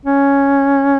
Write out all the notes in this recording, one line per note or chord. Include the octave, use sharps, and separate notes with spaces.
C#4